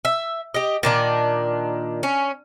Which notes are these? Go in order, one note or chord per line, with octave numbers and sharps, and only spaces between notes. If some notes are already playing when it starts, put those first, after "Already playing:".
E5
G4 D#5
A#2 D#3 D4
C#4